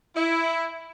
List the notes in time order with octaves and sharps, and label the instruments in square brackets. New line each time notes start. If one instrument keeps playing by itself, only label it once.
[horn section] E4